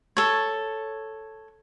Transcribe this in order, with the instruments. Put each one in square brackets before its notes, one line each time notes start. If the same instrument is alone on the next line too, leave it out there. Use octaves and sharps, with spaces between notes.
[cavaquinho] A4 C#5